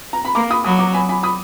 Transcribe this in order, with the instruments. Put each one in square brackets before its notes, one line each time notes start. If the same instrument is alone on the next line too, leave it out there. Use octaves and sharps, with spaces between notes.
[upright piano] A#5
B5
[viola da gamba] A#3 [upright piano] A#5 D6
[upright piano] B5 D#6
[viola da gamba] F#3 [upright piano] B5 D#6
[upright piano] A#5 D6
G#5 B5
G#5 B5
B5 D#6